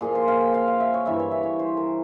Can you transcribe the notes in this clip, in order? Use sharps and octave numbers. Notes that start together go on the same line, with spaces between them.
A#2 F3 G#4
C5
F5
G5
F5
F5
E5
C#5
G2 E3 E5
C#5
E5
C#5
C5
A#4